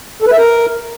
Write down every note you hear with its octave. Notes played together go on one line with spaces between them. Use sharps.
A4
B4
E5
A#4